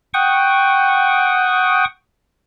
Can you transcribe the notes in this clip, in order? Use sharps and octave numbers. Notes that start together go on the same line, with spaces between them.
F#5 G5 C#6 D#6